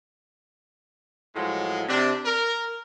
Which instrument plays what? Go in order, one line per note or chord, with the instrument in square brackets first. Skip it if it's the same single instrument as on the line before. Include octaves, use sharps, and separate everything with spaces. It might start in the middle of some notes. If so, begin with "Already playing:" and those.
[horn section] A2 F3 F#3 G#3
C3 D4
A#4